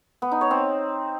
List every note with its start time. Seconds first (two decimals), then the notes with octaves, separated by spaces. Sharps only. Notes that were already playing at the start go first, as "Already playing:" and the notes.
0.22 B3
0.31 D#4
0.41 C#5
0.51 C4